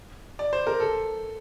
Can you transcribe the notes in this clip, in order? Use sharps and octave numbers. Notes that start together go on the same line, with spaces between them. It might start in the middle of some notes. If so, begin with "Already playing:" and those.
D5
C5
A#4
A4